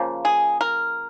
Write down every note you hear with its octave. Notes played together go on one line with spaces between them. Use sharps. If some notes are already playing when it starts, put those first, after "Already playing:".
Already playing: C#3 F3 A#3
G#4
A#4